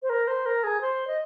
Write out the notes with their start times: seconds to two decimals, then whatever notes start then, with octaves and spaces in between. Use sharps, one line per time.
0.02 C5
0.09 A#4
0.27 C5
0.45 A#4
0.63 G#4
0.81 C5
1.07 D#5